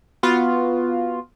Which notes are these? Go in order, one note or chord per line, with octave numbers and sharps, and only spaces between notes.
B3 F4 F#4